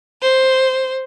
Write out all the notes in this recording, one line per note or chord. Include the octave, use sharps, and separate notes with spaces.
C5